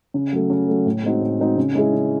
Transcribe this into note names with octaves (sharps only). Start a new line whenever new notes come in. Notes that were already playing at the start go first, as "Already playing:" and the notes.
C#3
F#3 A3
C#3
F#3 A3
A2
G#3 C4 D#4 F#4
A2
G#3 C4 D#4 F#4
C#3
G#3 C#4 E4 G#4
C#3